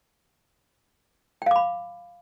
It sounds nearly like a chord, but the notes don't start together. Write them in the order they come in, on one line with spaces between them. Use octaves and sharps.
G5 F5 D6 B5